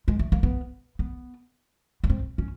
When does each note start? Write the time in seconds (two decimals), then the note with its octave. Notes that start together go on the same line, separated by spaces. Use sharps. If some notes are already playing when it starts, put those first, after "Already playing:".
0.08 G#3
0.19 A3
0.32 A#3
0.43 B3
0.99 B3
2.04 B3
2.10 C4
2.38 C#4